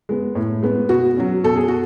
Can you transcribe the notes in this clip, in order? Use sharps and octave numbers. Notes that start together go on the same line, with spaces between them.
G#3 B3
A2
G#3 B3
B2 F#4
F#3 C#4
B2 A4
G#4
F#4